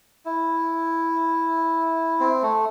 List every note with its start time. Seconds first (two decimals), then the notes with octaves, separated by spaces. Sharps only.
0.26 E4
2.20 C4
2.42 A3